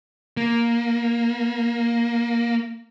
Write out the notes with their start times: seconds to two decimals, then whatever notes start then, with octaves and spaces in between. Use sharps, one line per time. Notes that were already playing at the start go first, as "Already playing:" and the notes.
0.37 A#3